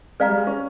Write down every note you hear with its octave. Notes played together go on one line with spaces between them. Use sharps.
G#3 B4 D5 F5 A#5
G3
G#3
C#4